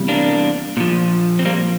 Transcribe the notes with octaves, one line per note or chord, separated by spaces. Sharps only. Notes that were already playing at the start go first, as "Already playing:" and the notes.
Already playing: E2 C3 G3
A#3 D4
A#2 F3
C4
G3 A#3